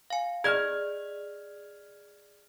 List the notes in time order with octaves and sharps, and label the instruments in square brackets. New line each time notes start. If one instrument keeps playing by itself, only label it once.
[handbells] F5 G#5
[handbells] G#4 D5 D#5 [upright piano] F6 G#6